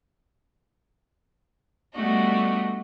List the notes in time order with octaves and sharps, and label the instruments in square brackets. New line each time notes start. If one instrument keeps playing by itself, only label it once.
[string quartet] G3 A3 B3 D4 F#4 D#5